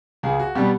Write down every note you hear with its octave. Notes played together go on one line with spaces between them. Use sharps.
C#2 G#4
F#4
B2 G3 B3 G4